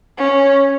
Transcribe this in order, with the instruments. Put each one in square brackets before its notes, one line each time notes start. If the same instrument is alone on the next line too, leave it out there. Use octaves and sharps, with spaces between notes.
[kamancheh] C#4